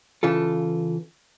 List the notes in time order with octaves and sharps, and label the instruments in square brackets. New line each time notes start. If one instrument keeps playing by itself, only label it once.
[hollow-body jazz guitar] C#3 E3 F4 A4